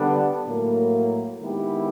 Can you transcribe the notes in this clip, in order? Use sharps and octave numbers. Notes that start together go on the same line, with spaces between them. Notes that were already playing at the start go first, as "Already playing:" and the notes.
Already playing: D3 G3 B3 D4
A2 F#3 A#3
D#3 G#3 B3 E4 G4